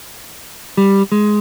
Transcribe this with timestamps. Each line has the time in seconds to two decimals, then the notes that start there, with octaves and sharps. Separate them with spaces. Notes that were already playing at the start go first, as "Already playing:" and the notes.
0.77 G3
1.12 G#3